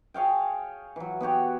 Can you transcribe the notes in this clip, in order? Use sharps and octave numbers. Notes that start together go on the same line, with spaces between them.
G#4 C#5 F5 G5
E3 F#3
B3 F#4 G4 C#5